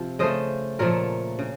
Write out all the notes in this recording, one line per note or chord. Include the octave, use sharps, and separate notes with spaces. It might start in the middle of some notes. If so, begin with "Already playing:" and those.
Already playing: C3 F3
C#3 A3 C5 D#5
A#2 F3 A3 A#4 C#5
C#3